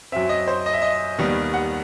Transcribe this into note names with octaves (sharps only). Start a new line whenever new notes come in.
F#2 F#3 C4 E5
D#5
C5
D#5
E5
D#5
D#2 D#3 G3 B3
F#5